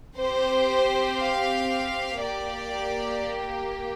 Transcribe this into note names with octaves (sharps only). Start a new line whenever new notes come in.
C4 G4 C5
F5
A#3 G4 D5